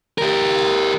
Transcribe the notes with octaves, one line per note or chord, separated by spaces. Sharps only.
G4 A#4